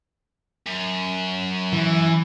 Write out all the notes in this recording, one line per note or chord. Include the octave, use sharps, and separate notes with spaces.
F#2
E3